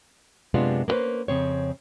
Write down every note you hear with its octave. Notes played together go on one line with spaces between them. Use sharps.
F#2 C3 G#3 B3 D4 F4
A#3 B3 C#4 B4 C5
F2 C#3 C4 C#5